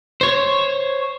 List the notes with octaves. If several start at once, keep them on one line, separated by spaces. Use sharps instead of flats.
C5 C#5